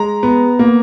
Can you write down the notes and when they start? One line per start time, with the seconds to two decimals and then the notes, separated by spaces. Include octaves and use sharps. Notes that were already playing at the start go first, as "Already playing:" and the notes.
Already playing: G#3 A#5
0.23 B3
0.59 A#3